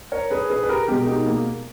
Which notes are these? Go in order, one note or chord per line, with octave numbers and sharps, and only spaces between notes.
A#4 C#5
G#4 B4
G#4 B4
B4
G4 A#4
B2 G#3 G4 A#4
D#4 G4
A#3